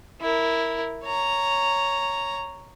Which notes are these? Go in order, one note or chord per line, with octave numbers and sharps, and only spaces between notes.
E4 A#4
C#5 A#5